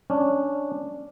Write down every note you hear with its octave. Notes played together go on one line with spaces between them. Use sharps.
C#4 D4